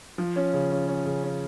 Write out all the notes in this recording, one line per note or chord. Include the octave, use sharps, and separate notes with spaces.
F3
C#4
C#3
C#4
C#4
C#3
C#4